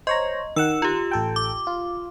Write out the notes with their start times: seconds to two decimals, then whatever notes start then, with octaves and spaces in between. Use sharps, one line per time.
0.07 C5 C#5 D#5 A#5
0.56 D#3 F#5 E6 E7
0.82 F4 G4
1.11 A1 A4 G5
1.36 D6
1.67 F4